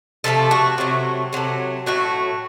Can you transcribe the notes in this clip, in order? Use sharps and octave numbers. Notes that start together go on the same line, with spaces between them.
C3 F3 A3 A4
F#4
C3 F#3 A3
C3 F#3 A3
A2 F#3 A3 F#4